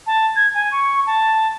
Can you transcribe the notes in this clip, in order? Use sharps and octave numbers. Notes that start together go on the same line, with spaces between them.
A5
G#6
G#5
C#6
A5